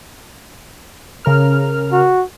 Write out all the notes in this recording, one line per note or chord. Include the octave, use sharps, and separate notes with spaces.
C#3 A#4 F6
F#4